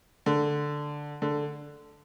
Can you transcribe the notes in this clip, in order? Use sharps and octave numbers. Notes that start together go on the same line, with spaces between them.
D3
D3